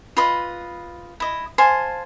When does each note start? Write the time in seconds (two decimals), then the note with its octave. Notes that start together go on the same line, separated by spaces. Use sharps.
0.17 F4 B4 D#5
1.20 E4 D#5
1.58 C5 F5 G#5 A5